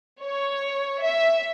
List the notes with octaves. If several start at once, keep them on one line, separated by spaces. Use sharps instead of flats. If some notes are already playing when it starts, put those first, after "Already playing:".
C#5
E5